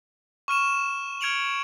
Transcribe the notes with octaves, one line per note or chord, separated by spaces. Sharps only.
C#6 F6 D#7 E7
F6 G#6 C#7 D7 F7 F#7